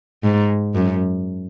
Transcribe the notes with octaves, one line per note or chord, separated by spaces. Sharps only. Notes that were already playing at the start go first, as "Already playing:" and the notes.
G#2
F#2